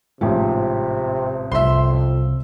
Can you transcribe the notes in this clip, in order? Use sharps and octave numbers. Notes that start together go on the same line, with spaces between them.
A1 G#2 C3 F3
C2 F2 E5 C6